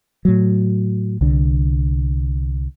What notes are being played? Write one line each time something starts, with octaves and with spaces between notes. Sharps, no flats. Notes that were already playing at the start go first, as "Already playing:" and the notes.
A2 F#3
C2 D3